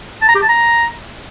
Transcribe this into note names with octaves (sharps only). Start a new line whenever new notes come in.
A5
A#5
G4
A5
A#5